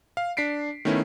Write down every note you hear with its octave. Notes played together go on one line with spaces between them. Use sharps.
F5
D4 B6 C7 D7
D#3 A3 B3 C#4 E4